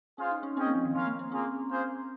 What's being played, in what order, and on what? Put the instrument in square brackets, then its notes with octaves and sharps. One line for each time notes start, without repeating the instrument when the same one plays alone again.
[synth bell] C#4 [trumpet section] F4 G#4 C5 F5
[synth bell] D#4
C#4
[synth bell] C4 [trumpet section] C#4 G#4 D#5 G5
[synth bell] A#3
F3
D#3
[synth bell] F3 [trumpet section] C#4 F4 A#4 F5
[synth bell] A#3
C4
[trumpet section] A#3 F4 G#4 [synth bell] C#4
[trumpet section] A#3 F4 G#4 C5